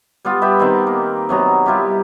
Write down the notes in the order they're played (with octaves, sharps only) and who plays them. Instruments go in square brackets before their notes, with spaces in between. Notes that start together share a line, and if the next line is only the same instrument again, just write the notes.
[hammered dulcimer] G3 B3 F4
G4 B4 E5 G5
D#3 B3 C4
A#3
C3 F#3 B3 A#5
G3 E4 F4 G4